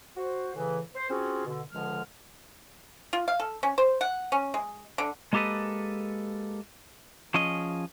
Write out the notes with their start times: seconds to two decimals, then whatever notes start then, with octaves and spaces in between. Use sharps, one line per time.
0.16 F#4 C5
0.55 A2 C#3 E3
0.95 C5
1.10 C4 C#4 F4 F#4 G#4
1.46 B2 D3
1.72 C#2 D3 F3 G#3 F6
3.13 F4
3.28 F5
3.40 A4
3.63 C#4
3.78 C5
4.01 F#5
4.32 C#4
4.54 G#3
4.98 D3
5.33 G#3 A#3 G4 A4 B4 D#5
7.34 F3 C#4 G#4 D#5